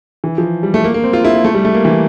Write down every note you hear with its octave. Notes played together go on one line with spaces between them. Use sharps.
E3
F3
G3
A3
A#3
A#3
C4
F4
E4
A#3
A3
G3
A3
A#3
E3